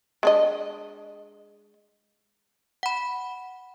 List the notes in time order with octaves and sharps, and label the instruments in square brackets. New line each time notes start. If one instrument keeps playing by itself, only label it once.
[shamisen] G#3 D4 D#5
[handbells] F#5 B5